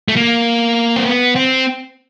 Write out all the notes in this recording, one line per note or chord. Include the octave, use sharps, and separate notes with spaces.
A3
A#3
C4
B3
C4